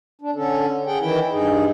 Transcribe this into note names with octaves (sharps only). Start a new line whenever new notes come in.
D4
D3 C#4 A4
G#4 F#5 G5
D#3 E3 E4 G5
G2 D#4 G#4